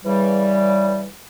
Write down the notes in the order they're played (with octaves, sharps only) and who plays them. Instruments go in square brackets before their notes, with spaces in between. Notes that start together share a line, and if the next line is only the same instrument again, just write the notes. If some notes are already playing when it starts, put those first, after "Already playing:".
[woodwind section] C#3 E3 G3